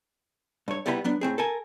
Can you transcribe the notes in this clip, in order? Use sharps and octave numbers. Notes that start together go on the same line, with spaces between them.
G2 C#5
C2 G3 B3 E4 A#5 B5
F#3 B3 D4
A2 C4 G#4
A4 A#4 G#5